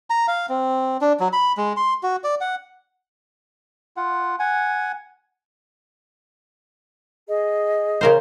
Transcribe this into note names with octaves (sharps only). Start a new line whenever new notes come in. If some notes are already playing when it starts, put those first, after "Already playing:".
A#5
F5
C4
D4
F#3
B5
G#3
C6
F#4
D5
F#5
F4 F#5
F#5 G#5
G#4 D#5
C#3 A#4 C5